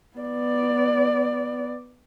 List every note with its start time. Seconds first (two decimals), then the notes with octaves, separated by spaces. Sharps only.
0.17 B3 D5